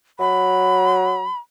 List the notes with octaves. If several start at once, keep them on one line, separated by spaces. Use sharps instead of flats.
F#3 B5